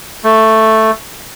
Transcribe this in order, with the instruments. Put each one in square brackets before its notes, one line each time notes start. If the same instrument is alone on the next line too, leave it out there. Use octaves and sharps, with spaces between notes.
[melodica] A3